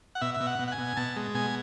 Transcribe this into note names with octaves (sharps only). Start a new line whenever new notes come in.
F#5
B2 E5
E5
B2
F#5
B2
F#5
G#5
B2
B2 A5
G#3
B2 G#5